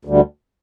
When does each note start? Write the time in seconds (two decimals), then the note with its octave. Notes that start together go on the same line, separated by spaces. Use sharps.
0.05 D2 D3 G3